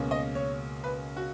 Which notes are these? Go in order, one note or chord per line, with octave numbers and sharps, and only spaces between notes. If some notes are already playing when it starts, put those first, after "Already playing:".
Already playing: C#2 B2 A#3 C#4
D#5
C#5
B4
F#4